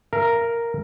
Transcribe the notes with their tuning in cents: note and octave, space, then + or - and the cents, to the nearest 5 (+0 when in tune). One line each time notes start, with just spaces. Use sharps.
A#4 +0 F5 -45